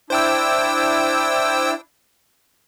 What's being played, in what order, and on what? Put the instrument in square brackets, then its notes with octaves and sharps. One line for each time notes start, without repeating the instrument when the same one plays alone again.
[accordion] D4 E4 [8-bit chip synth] C5 G5 E6